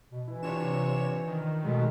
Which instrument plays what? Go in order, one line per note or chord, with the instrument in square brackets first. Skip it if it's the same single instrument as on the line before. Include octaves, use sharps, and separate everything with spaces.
[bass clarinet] B2
[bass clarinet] E3 [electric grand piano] E4
[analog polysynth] C3 C#5 E7 [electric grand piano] D4 F4
[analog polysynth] D#3
[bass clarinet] B2 [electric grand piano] F#3 G#3 A3